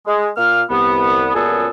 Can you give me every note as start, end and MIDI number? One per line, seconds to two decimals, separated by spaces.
0.07 0.28 56
0.37 0.63 46
0.37 0.63 58
0.37 0.63 77
0.37 0.63 89
0.70 1.31 36
0.70 1.31 59
1.35 1.68 37
1.35 1.68 42
1.35 1.68 46
1.35 1.68 59
1.35 1.68 68
1.35 1.68 69